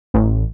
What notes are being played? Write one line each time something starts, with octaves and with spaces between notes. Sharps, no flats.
A1